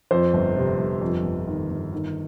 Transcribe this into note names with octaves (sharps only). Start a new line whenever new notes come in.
F2 C5
G1
C3
G1
F2
G1
D#3
G1
D#3